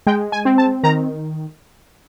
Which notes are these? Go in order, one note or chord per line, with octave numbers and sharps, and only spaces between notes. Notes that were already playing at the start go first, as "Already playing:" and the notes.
G#3 G5
G#5
C4
A5
D#3 A#5